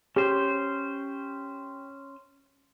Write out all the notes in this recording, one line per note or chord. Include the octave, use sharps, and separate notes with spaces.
C#4 G4 C5